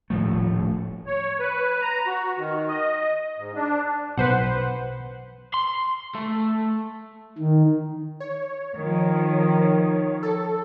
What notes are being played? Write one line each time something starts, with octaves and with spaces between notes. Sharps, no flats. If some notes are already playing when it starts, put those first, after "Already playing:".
D#1 A2 F3 A3
C#5
B4
A#5
F#4
D#3
D#5
G#2
D4
B1 B4 C5 F#5
C6
A3
D#3
C#5
D#3 F3
A4